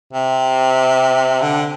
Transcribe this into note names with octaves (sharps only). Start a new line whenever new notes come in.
C3
D3